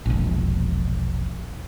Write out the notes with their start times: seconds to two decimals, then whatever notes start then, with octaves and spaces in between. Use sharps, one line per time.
0.06 E1 A#1